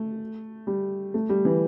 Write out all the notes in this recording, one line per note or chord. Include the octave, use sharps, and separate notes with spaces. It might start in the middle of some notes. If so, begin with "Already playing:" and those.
Already playing: A3
G3
A3
G3
E3